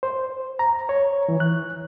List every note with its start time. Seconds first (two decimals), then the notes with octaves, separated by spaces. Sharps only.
0.03 C5
0.59 A#5
0.89 C#5
1.29 E3
1.40 F#6